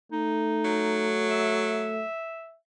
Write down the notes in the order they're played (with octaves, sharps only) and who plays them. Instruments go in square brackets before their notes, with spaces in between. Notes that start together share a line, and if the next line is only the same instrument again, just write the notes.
[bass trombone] A3 [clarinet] D#4
[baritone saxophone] F#3
[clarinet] E5